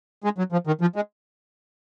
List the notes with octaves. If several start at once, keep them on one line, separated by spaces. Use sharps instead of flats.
G#3
F#3
F3
D#3
F3
G#3